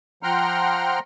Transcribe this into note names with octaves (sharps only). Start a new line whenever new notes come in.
F3 F#5 G5 A#5 C6 F6